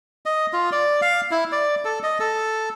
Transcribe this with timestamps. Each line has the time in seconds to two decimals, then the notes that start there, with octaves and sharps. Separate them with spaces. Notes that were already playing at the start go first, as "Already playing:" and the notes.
0.26 D#5
0.53 F4
0.72 D5
1.02 F5
1.31 E4
1.52 D5
1.85 A4
2.03 D#5
2.20 A4